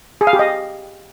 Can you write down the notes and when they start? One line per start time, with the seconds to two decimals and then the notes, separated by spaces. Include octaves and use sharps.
0.21 G#4
0.27 F5
0.33 G4
0.39 D#5